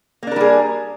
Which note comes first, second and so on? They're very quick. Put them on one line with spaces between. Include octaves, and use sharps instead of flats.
A#3 D4 A#4 G3 G#4